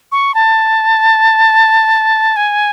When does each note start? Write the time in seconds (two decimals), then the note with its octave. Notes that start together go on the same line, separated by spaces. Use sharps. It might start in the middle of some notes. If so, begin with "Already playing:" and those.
0.12 C#6
0.35 A5
2.36 G#5